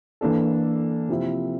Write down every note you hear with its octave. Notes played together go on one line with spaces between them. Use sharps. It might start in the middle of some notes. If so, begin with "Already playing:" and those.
E3 A#3 D4 A4
C3 F3 C4 E4